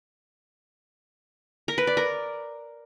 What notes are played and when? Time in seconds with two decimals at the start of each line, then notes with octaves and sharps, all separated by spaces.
1.68 A#4
1.78 B4
1.87 D5
1.97 A#4